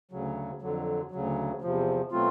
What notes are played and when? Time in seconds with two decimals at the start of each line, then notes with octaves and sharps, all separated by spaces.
0.11 D2 C#3 F#3
0.61 F2 D3 F#3
1.11 D2 C#3 F#3
1.62 E2 C3 F3
2.11 B2 F#3 A3 C4 F4